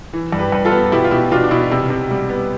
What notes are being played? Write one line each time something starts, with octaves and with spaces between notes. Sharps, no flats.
E3
G2
G4 B4
G2 B4
F4 A4
B3
B2 E4 G4
F4
B2 E4 G4
B2 D4 F4
D4
B2 E4
C3
C3
G3
B3